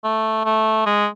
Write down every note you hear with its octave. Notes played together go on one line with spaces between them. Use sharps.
A3
A3
G#3